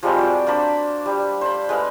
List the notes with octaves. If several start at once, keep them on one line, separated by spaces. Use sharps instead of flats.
F3 G3 G#3 C4
F#4 D5
A#3 D4 C5 B5
G3
C5 B5
G#3 B4 F5